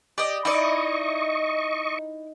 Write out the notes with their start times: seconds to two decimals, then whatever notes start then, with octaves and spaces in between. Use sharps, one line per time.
0.18 G4 D5 D#5
0.45 D#4 E4 D5 D#5 C#6